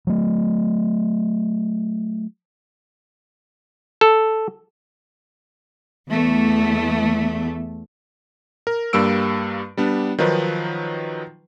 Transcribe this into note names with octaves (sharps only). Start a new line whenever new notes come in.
F#3 A3
A4
E2 A3
A#4
G2 G3 A#3 E6 D7
G3 B3 D4
D#3 F3 F#3 D#4 B4